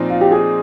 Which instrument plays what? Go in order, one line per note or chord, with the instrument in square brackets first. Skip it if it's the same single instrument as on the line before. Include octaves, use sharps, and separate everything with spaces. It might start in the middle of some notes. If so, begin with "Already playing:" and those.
Already playing: [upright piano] A#2 F3 C4 D#4
[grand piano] F4
G4
G#4